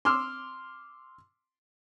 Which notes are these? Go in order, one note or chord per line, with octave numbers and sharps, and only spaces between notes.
C6 D6 E6 F6